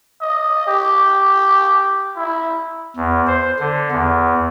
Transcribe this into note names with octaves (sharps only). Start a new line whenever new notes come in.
D#5
G4
E4
E2
C5
D3
E2